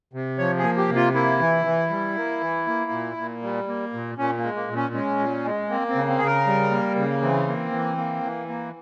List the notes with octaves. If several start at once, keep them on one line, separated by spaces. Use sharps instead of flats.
C3
F3 C#5
G#4
A#3
G4
C3
F4
A#3 E4
E3
E3
G3
A#3
E3
A#3
A#2
A#2
G3
A#3
A#2
A#2 C#4
A#3
G#3
A#3
A#2
C#4
G#3 C#4
A#2
G#3
A#3 C4
C4
C#3
C4
C#3 G#4
A#4
G3
A#3
C#3
E3 C4
A#3
E3
A#3
E3
A#3